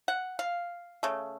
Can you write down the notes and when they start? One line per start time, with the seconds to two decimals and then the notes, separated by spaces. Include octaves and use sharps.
0.08 F#5
0.39 F5
1.03 C#3 A3